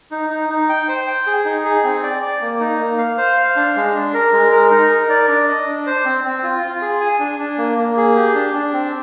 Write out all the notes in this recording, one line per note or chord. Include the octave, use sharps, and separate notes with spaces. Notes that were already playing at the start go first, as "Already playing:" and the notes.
D#4
D#4
D#4
G5
C5
G5
G#4
D#4
G#4
C4
D5
D5
A#3
D#4
A#3
F5
C5
F5
D4
G#3
D4
A#4
G#3
A#4
D#4
A#4
D5
D4
D#5
D4
C5
C4
C4
F4
F4
G#4
G#5
D4
D4
A#3
A#3
G#4
G4
D4
D4
C4